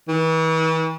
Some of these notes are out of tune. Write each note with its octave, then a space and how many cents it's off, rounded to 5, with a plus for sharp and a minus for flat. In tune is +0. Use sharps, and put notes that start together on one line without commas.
E3 -40